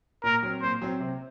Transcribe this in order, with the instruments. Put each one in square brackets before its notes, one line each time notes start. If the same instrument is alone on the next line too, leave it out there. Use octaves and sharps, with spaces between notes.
[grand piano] A#2 [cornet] A#4
[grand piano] F#3 C4
[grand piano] A#2 [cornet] C5
[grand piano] F#3 C4
C3